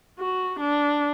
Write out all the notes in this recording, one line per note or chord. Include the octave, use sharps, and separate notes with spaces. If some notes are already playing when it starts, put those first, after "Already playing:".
F#4
D4